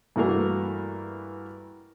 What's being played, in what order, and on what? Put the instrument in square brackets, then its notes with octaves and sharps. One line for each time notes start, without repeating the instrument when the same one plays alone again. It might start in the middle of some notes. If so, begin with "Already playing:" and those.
[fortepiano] G2 E3 A3 A#3 F#4 A#4